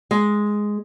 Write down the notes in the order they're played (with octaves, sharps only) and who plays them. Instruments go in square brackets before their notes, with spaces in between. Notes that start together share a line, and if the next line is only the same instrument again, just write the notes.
[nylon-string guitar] G#3